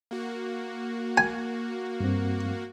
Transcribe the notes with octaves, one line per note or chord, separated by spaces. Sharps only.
A#3 F#4
G#5
G2 C4